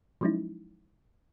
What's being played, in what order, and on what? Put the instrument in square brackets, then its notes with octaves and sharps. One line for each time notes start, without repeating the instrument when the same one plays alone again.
[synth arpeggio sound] F3 F#3 G#3 C#4 D#4 E4